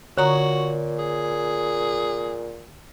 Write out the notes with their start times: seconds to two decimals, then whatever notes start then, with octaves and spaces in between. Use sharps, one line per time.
0.18 A#2 D3 F#4 C#5 A#5 D#6
0.98 G#4